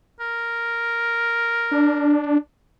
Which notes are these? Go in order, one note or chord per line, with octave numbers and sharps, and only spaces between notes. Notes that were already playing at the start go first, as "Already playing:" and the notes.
A#4
D4